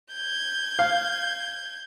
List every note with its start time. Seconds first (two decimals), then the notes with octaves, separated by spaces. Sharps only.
0.12 G6 G#6
0.79 F5